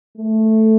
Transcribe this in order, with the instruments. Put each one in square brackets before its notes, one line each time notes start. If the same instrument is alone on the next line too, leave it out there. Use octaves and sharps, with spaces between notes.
[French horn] A3